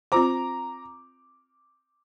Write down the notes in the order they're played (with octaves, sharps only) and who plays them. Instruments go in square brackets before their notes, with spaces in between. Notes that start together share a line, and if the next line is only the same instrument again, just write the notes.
[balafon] C4 F4 C5 [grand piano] A#5 D6